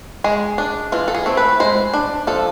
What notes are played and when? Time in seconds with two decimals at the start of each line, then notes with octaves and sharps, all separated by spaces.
0.24 G#3 G#4
0.58 D4
0.92 E3 F4
1.08 A4
1.15 G#4
1.26 A3 C4
1.37 B4
1.60 G#3 C5
1.94 D4
2.27 F3 A4